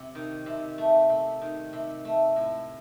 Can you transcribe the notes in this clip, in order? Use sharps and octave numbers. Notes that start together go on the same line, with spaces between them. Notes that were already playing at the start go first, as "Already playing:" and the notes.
Already playing: C3
D#3
C3
A3
C3
D#3
C3
A3
A2